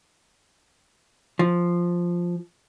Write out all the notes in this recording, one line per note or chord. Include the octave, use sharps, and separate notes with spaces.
F3